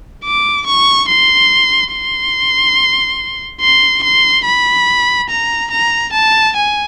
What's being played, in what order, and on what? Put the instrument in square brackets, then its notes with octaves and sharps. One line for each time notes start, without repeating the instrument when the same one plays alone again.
[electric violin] D6
C#6
C6
C6
C6
C6
B5
A#5
A#5
A5
G#5